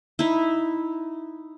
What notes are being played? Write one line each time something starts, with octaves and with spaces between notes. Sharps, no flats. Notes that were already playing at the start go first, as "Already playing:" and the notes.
D#4 E4